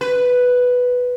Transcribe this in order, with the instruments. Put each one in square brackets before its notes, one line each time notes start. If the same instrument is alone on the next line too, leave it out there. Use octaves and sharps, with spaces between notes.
[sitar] B4